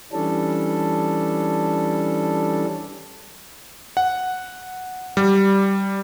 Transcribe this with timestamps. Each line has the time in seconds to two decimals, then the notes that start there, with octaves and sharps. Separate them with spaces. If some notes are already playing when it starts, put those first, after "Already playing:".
0.13 E3 G3 C#4 D4 A4
3.97 F#5
5.17 G3